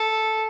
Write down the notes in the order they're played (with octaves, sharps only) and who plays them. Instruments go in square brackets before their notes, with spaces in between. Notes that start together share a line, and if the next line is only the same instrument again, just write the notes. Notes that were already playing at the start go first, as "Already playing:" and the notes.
Already playing: [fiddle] A4